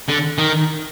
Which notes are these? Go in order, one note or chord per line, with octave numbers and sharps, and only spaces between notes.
D3
D#3